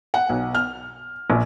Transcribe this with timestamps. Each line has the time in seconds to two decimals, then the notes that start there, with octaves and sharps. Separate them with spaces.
0.14 F#5
0.29 B1
0.55 F6
1.30 A#1